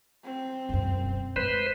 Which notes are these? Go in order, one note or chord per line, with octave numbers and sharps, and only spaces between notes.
C4
E1 F#2
G#3 B4 C5